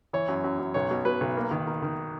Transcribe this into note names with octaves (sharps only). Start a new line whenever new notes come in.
E3 C#5
F#2
F#2
F#2
B1 C#5
B2
B2 B4
B1
A#3
D#3
D#3
D#3